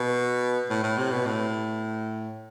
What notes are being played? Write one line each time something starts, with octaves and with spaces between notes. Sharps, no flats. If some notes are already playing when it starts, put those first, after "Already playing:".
Already playing: B2
A2
A2
C3
B2
A2